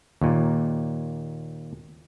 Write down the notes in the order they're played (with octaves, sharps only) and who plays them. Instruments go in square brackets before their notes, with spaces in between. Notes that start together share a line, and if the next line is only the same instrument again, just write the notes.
[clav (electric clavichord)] D#2 A#2